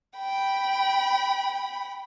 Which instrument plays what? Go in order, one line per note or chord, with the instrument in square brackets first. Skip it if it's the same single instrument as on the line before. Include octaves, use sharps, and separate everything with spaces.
[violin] G5 B5